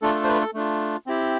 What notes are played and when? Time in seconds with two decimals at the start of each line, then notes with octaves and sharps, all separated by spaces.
0.02 A3 D4 F4 A4
0.14 A4
0.24 C5
0.28 B4
0.41 A4
0.54 A3 D4 F4
1.07 C4 E4 G4